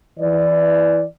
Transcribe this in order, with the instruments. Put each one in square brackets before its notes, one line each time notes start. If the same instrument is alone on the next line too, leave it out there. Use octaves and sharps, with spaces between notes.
[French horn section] E3 D5